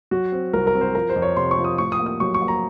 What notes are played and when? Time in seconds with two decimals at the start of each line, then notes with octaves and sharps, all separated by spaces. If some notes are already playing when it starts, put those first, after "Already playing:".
0.11 F#3 F#4
0.32 C4
0.53 C2 A#4
0.67 A#4
0.74 C4
0.81 C5
0.94 F3 A#4
1.10 C5
1.16 F2
1.22 C#5
1.37 C3 C6
1.51 C#6
1.58 F3
1.64 D#6
1.78 A2 C#6
1.92 D#6
1.99 A#3
2.06 D#6
2.20 F#3 C#6
2.34 C#6
2.42 A#3
2.48 A#5